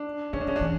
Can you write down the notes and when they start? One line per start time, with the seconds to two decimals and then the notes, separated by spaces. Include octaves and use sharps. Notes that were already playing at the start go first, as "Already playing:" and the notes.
Already playing: D4
0.33 D#3 C#4
0.41 D4
0.47 D#3 C#4
0.56 D4
0.61 E3